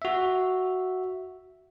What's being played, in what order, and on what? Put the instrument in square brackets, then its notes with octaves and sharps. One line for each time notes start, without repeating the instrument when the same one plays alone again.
[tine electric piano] F#4 E5